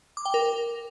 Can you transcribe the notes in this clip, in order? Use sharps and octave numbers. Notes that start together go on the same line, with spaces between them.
D6
G5
A#4